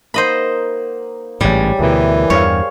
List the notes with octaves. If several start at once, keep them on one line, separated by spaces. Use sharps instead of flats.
A#3 D#4 C5 D#5 F#5 B5
A1 G#2 G3 G4 G#4 C#5
D2 B2 E3 G#4 A#4 E5
E2 G2 C5 C#5 F5